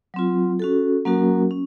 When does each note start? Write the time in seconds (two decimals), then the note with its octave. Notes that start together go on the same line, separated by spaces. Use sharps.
0.14 F#3 C4 F4
0.59 C#4 F#4 A4
1.05 F#3 A#3 C#4 F#4 A#4
1.51 C#4